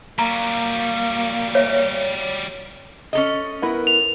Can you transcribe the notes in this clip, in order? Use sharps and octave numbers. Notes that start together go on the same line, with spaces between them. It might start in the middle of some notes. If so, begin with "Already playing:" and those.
F#3 G3 A#3 A#5
C#5 E5
C#4 A4 D#5
B3 E4 A#4
F7